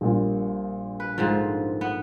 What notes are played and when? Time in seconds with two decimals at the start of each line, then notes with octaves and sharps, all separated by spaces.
0.01 A#1 A#2 G3
1.00 B4
1.18 G#2 D3 F3
1.81 B3